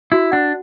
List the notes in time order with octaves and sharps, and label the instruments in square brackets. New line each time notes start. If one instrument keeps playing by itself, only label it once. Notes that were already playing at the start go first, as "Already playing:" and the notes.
[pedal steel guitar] E4 [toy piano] F#4
[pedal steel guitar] D4 [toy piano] F#5